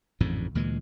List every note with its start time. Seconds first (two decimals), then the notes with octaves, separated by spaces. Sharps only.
0.20 A1 F2 G#2 D3
0.55 D2 A#2 E3 G#3